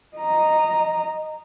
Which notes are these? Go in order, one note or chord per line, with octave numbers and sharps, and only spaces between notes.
D#5 A#5